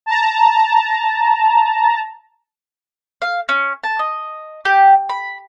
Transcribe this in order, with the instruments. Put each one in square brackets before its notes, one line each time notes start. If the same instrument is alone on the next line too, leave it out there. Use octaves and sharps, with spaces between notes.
[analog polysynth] A5 A#5
[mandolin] F5
C#4
A5
D#5
G4
B5